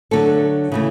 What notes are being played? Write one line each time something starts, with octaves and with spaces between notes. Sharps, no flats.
D3 F#3 A3 A4
C#3 E3 A3